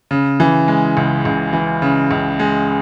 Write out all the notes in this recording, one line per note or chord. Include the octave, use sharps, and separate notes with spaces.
C#3
E3
G#3
C#2
C#2
E3
C#3
C#2
G#3